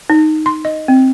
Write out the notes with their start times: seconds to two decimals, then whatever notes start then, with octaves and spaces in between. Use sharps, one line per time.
0.10 D#4
0.46 C6
0.65 D#5
0.88 C4